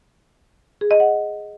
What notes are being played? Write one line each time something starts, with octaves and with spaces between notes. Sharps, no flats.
G#4
D#5
F#5